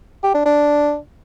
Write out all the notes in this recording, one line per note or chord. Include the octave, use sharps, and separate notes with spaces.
G4
D4
D4